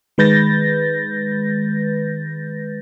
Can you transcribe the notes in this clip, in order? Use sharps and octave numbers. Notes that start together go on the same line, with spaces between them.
D#3 G#3 B4 G6 A6 A#6